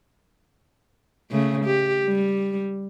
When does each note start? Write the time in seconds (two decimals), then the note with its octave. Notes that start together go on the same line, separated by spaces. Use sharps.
1.31 C#3 A3
1.65 G4
2.05 G3